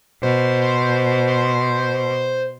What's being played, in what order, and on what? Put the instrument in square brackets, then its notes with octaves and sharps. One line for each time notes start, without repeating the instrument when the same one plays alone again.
[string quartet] B2 [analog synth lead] C5